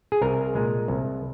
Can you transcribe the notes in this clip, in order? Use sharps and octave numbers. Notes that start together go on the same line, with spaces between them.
G#4
C2 A#4
A#2 G#3
C2